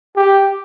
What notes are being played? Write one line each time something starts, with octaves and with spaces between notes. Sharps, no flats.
G4